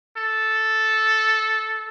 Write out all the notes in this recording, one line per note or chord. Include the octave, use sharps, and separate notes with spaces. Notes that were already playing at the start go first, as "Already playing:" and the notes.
A4